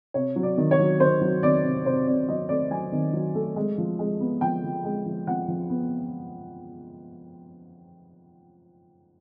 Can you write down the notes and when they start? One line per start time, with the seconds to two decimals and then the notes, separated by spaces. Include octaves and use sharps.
0.14 C3 C#5
0.36 F#3
0.43 D5
0.58 D#3
0.71 C#5
0.79 F#3
1.00 D#3 C5
1.21 F#3
1.43 D#3 D5
1.64 C3
1.86 C3 C5
2.07 C3 D5
2.28 F#3 D#5
2.49 A3 D5
2.71 F#3 G#5
2.92 D#3
3.13 F#3
3.35 A3
3.56 G#3
3.78 F3
3.99 G#3
4.20 B3
4.41 F3 G5
4.64 F3
4.84 G#3
5.06 F3
5.27 F3 F#5
5.48 F3
5.70 B3